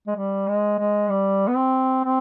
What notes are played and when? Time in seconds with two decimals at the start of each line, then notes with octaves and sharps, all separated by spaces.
0.07 G#3
0.16 G3
0.48 G#3
0.79 G#3
1.10 G3
1.48 B3
1.56 C4
2.04 C4